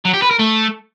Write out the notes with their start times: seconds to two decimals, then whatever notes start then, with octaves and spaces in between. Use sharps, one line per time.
0.05 F#3
0.14 G4
0.22 B4
0.31 A#4
0.39 A3